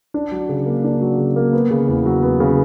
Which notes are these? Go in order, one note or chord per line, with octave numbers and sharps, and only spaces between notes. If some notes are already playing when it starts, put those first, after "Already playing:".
D4
F#3
C#3
A#3
D4
F#3
C#3
A#3
B3
C#3
E2
F#3
B3
C#3